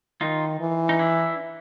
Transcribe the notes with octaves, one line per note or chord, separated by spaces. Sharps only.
D#3 D#4 F4
E3
D#4
D4 E4